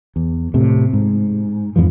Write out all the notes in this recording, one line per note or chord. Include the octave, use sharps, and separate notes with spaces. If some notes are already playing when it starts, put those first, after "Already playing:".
E2
A2 C3
G#2
F2 G#2 E3 F3